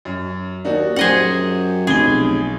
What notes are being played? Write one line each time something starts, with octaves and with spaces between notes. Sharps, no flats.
F#2
D#2 D4 D#4 F#4
F#2 G4 G#4 C5 D#5 F#5
F1 B1 G#4 G7